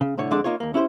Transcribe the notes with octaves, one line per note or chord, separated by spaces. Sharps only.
C#3
C2 A2 D3 C#5
F2 D3 G#3 D4 D5
A#3 D#4 F4 C#5
D#2 A#3
C#4 E4 G4 B4 C5